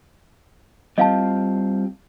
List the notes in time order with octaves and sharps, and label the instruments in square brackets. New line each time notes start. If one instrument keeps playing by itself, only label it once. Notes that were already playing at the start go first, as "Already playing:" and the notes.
[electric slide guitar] G3 C4 F4 [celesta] D#5 F5 A5